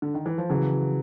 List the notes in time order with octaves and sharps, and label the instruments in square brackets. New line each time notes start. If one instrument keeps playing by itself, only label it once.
[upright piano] D3
D#3
E3
F3
[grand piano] C#3 [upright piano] E3 F#3